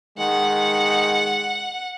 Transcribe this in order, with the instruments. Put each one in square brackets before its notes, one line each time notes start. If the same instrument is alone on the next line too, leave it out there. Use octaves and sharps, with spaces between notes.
[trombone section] D#3 G#3 [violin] F#5